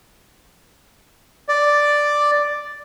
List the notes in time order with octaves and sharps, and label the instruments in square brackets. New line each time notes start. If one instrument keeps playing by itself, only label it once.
[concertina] D5